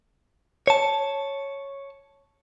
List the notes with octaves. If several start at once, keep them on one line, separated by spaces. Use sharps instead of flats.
C#5 A5